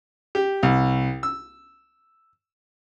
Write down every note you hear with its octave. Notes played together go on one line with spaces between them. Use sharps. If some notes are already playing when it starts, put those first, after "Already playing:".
G4
C2
E6